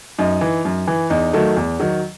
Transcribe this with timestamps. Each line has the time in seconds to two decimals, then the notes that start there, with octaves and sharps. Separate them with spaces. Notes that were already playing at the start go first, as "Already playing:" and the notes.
0.18 F#2 D#4
0.41 E3
0.65 F#2
0.87 E3
1.10 E2 D#4
1.33 D#3 F#3 A3
1.56 E2
1.80 D#3 F#3